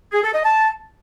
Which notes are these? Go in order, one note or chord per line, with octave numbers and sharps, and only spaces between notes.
G#4
A4
D#5
A5